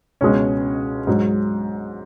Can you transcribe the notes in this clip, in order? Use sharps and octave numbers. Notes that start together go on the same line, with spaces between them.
C#2 B2 G#3 C#4
G#2 F#3